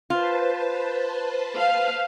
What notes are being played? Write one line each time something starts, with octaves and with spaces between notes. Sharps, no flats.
F4 B4 C5 A5
F5